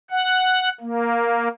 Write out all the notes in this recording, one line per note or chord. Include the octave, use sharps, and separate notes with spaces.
F#5
A#3